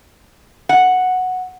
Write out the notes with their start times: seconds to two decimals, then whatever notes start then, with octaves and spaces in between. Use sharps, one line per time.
0.69 F#5